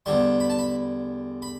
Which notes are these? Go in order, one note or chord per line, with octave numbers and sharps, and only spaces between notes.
E2 D3 G3 C6
B5
A5
B5
B5